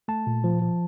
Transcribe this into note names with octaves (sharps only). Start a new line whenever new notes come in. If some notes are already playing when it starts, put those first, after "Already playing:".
A3 A5
A#2
F3
F3